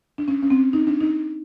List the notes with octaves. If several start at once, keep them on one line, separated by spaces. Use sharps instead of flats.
D4
C#4
C#4
C4
D#4
D4
D#4